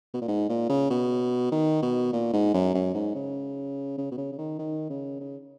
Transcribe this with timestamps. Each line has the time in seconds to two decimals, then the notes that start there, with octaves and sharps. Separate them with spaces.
0.14 B2
0.22 A#2
0.28 G#2
0.49 A#2
0.69 C#3
0.90 B2
1.52 D#3
1.82 B2
2.13 A#2
2.33 G#2
2.54 F#2
2.74 F#2
2.94 G#2
3.15 C#3
3.98 C#3
4.11 B2
4.18 C#3
4.32 C#3
4.38 D#3
4.59 D#3
4.90 C#3
5.20 C#3